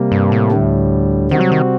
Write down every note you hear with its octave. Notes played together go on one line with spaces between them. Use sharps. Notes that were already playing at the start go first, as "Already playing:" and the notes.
Already playing: C3 G3 A#3
G2
A2
D2 D3 G3
C3 D#3 G3 C4 F#4
F#3
D#3